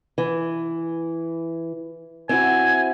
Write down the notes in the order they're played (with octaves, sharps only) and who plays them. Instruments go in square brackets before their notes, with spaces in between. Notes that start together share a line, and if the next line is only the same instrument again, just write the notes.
[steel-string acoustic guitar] E3
[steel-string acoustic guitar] C4 E4 F#4 [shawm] G#5